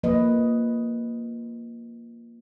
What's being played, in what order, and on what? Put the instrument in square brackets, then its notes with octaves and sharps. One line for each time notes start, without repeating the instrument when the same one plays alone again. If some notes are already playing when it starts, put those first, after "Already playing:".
[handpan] F3 A#3 B4 D#5